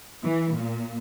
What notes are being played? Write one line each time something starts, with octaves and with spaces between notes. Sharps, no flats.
E3
A#2